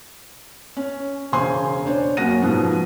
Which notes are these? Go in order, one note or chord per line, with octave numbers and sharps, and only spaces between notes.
C#4
E1 C#3 C5 G#5 C6
D4 C5 C#5
F#2 A#3 F#4 F#5 A#6 D#7
G#2 B2 F3